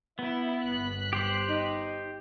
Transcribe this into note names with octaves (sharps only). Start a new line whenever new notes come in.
B3 E4
G1 F#6 B6
G4 C5
D#4